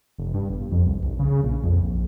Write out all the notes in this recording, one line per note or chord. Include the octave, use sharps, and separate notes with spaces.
F1
G2
G1
F2
C2
B1
C#3
A#1
F2
A#1